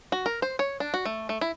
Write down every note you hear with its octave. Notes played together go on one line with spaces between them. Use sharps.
F#4
A#4
C5
C#5
D4
F#4
A3
A3
E4